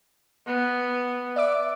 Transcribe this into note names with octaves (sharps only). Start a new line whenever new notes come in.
B3
D5 E5 D6